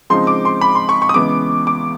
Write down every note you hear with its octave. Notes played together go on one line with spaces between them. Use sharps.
C#3 F3 G#3 C4 D#4 C6
D6
C6
B5
C6
C#6
C#6
D#6
C#2 C#3 E3 G#3 B3 D6
D6